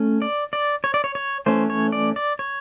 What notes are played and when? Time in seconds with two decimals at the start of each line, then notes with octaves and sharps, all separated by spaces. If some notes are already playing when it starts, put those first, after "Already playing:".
Already playing: A3 C#4
0.22 D5
0.53 D5
0.84 C#5
0.94 D5
1.04 C#5
1.15 C#5
1.46 E3 A3 C#4 C5
1.70 C#5
1.92 D5
2.16 D5
2.39 C#5